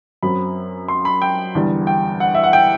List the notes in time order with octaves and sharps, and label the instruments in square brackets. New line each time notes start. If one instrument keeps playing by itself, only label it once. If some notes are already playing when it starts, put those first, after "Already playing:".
[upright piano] F#2 F#3 C4 B5
C6
B5
G5
E2 D3 G3
G5
F#5
E5
F#5
G5